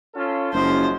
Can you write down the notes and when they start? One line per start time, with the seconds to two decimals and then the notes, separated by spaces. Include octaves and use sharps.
0.15 C#4 F4 A4
0.53 F#1 F#2 F3 G#3 C5